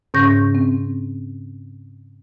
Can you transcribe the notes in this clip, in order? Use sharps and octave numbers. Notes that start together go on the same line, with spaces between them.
G#2 C#3 C#4 C#6 G6 A#6
C4